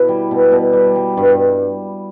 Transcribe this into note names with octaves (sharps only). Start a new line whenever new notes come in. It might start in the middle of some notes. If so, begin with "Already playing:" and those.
Already playing: B2 E4
G3
B2
B2
G3
G3
G2